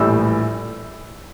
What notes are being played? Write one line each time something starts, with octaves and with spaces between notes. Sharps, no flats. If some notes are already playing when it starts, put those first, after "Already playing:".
Already playing: A#1 A2 E3 G3 E6